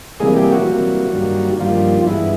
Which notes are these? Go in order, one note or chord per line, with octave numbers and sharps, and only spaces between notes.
C3 E3 G3 G#3 A#3 G#4
G3 G4
F#3 F#4
C3 E3 G3 A#3
G2 D#3 G3 A#3
G2 D#3 F3 G3 A#3 F4
G2 E3 G#3 B3 E4